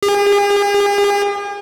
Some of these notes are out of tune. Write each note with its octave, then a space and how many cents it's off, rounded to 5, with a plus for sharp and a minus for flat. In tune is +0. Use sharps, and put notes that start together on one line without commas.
G#4 -45